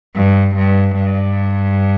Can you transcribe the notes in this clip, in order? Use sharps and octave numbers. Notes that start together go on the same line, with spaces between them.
G2
G2
G2